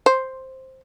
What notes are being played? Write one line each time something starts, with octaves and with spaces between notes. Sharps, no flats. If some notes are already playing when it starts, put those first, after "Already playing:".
C5